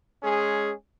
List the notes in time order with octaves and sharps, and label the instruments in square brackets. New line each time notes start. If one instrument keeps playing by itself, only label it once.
[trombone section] G#3 C#4 G#4